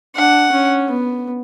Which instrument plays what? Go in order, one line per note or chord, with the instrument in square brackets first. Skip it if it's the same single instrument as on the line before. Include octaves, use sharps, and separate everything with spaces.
[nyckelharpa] D4 [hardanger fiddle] F#5
[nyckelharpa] C#4
B3